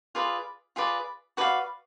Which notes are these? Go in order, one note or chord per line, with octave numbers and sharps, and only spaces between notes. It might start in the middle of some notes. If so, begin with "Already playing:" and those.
F4 G#4 B4 D5
F4 G#4 B4 D5
F#4 B4 D5 F5